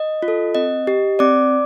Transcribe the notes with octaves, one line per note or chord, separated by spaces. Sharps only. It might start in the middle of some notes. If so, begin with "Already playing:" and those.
Already playing: D#5
F4
A4
C4 D#5
G4
C4 D5 D6